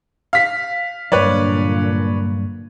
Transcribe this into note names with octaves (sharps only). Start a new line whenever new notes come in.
F5 B6
G2 A#2 D3 F#3 B4 C#5 D5